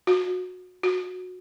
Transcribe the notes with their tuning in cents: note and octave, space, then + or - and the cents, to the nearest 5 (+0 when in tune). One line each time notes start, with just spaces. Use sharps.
F#4 -25
F#4 -20